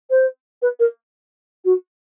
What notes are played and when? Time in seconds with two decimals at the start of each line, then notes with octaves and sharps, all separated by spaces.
0.10 C5
0.62 B4
0.80 A#4
1.65 F#4